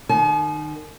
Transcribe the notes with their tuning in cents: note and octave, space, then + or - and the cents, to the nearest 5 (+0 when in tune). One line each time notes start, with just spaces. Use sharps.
D#3 -30 G#5 +45